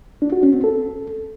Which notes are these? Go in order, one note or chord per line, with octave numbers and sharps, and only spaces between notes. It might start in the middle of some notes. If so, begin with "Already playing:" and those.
D4
F#4
C#4
C4
A4